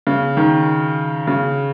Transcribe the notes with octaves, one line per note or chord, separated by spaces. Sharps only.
C#3
D#3
C#3